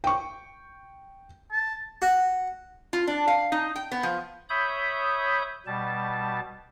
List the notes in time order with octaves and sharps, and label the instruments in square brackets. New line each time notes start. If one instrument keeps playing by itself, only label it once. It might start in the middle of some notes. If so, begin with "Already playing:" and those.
[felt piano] G5 C#6
[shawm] A5
[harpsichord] F#4
[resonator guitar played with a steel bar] F4
D4
F5
D#4
G5
B3
F3
[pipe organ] C#5 E5 B5 D#6 G6
B2 G3 A5